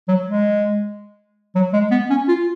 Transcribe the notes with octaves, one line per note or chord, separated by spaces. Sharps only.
F#3
G#3
F#3
G#3
B3
C#4
F4